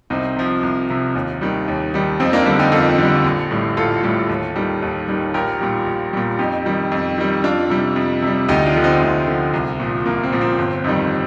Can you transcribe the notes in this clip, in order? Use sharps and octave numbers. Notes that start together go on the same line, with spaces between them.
C2 C4 D#4
C3 F3
C2
C3 F3
D#2
D#3 G3
D#2
D#3 G3
F2 C4 D#4
A#3 D4
D3 G3 A#3 D4
D#4 G4
F2 F4 A4
D3 G3
A#1
A2 G3
A#1 F4 A4
A2 G3
D#2
D#3 G3
D#2
D#3 G3
A#1 G4 A#4
A#2 G3
A#1
A#2 G3
F2 D#4 G4
D#3 G3
F2
D#3 G3
F2 D4 F4
C3 G3
F2
C3 G3
D2 D#4 G4
D4 F4
D3 F3
C4 D#4
D2 C4
D3 F3
C2
A#2 F3
C2 A#3
C4
A#2 F3
C4
G1
F2 D#3 G3